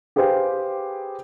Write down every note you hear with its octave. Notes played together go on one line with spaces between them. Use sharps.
G4 G#4 B4 C5 F5 G5